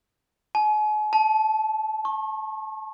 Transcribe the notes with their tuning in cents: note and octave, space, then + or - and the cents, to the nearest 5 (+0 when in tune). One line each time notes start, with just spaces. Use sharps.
G#5 +40
A5 -15
C#6 -35